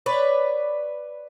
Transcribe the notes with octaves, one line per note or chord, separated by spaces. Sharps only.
B4 C#5 D5